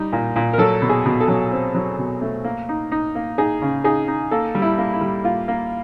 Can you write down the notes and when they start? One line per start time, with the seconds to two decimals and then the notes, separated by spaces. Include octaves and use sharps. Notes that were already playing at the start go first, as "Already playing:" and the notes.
Already playing: G3 D#4
0.13 A#2
0.36 A#2
0.53 A#4
0.58 F#3 A4
0.82 B2
0.89 G#4
1.06 B2
1.20 A4
1.28 F#3
1.52 C4
1.75 F#3
1.98 B2
2.22 A3
2.44 A#3
2.69 D#4
2.92 D#4
3.15 A#3
3.38 D#4 G#4
3.62 C#3
3.84 D#4 G#4
4.08 D#4
4.31 A#3 A4
4.55 G3
4.62 E4
4.78 A#3
4.93 E4
5.01 G3
5.24 A#3 F4
5.48 A#3